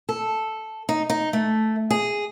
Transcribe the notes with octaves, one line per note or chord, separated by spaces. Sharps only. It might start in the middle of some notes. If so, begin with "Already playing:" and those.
A4
D#4
D#4
A3
G#4